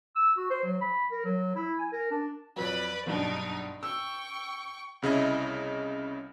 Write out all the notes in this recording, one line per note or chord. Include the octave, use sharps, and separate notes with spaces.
E6
F#4
C5
F#3
B5
A#4
F#3
E4
G#5
A#4
D4
F2 F#3 B4 D5
F#1 B1 G2 D4 D#4
G5 C#6 E6
C2 C#3 E4 D#5